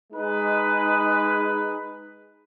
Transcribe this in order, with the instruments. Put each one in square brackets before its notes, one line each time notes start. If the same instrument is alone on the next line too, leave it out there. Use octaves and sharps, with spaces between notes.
[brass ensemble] G#3 D#4 B4